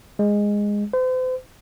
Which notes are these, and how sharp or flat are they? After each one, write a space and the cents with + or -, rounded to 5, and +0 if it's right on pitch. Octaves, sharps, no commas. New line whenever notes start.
G#3 -10
C5 -40